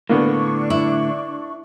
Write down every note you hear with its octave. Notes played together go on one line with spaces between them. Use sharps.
A2 D3 A#3 B3 D4 C#6
E4